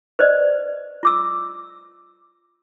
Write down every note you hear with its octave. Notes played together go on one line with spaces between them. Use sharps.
B4 C5 D5 D#5
F4 D6 E6